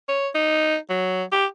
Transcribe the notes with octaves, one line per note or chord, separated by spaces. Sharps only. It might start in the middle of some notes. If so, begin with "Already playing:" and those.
C#5
D#4
F#3
G4